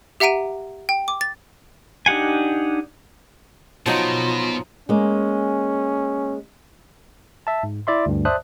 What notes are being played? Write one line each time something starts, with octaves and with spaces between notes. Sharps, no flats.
G4 E5 F#5 A#5 D7 D#7
G5
D6
A6
D4 D#4 G4 F#5 G#5
B2 F3 F#3 D#4 F4
G#3 A#3 C#4
E5 A5
G#2
E4 D5 E5 C6
D2 G2
C5 D5 E5 A5 D#6 F#6